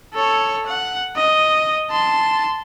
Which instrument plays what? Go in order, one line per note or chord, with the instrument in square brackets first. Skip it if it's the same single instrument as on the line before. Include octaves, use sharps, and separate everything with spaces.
[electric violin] A4 C#5
F#5
D#5
A5 C6